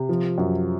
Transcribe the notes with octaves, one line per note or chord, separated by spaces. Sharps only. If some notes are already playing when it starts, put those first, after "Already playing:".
Already playing: C3
F3
F#2